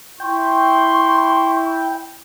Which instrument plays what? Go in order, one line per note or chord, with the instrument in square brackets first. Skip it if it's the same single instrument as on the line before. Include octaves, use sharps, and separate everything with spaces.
[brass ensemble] E4 [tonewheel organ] G5 [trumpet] C6 [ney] C#6